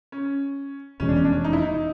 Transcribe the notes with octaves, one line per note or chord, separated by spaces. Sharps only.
C#4
F1 E2 B2 G#3 C#4
D4
C#4
D4
C#4
D#4
E4
D#4